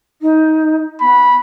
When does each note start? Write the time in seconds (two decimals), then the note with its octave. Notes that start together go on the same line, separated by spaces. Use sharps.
0.21 D#4
1.01 B3 B5